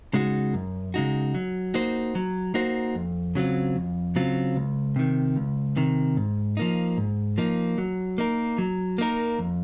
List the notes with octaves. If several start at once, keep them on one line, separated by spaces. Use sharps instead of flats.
C#3 G#3 D#4 F#4
F#2
C#3 G#3 D#4 F#4
F#3
A#3 D#4 F#4 C5
F#3
A#3 D#4 F#4 C5
F2
C#3 F#3 C4 F4
F2
C#3 F#3 C4 F4
C#2
C3 D#3
C#2
C3 D#3
G#2
F3 A#3 D#4
G#2
F3 A#3 D#4
F#3
A#3 D#4 A#4
F#3
A#3 D#4 A#4
F2